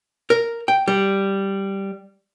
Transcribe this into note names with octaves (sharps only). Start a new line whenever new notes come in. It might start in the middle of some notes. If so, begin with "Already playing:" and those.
A#4
G5
G3